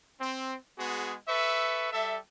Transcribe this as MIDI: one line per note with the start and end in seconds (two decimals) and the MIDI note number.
0.21 0.55 60
0.78 1.16 56
0.78 1.16 59
0.78 1.16 66
0.78 1.16 68
1.28 1.89 69
1.28 1.89 71
1.28 1.89 76
1.28 1.89 85
1.93 2.16 55
1.93 2.16 69
1.93 2.16 76